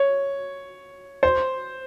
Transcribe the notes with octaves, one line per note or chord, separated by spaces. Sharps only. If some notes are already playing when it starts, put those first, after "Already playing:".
Already playing: C#5
C5